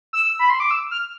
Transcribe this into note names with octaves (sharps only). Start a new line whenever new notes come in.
E6
B5
C6
D6
E6
F6